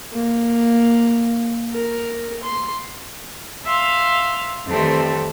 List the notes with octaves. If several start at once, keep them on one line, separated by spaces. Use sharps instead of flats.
A#3
A#4
C6
E5 F5 C6
F2 D#3 E3 G3 A3 C4